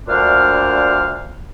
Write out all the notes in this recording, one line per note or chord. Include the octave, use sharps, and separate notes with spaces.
D2 A#2 D4 C5 F5 F6